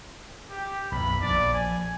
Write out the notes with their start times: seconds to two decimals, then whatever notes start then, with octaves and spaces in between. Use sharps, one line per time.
0.51 G4
0.92 B1 F#2 B5
1.22 A#1 D5
1.54 G#5